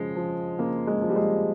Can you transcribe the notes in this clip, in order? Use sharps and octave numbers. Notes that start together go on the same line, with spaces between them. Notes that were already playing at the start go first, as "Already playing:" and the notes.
Already playing: C#3 F3 G#3
F3
C#3 A#3
G#3
F3
G3
G#3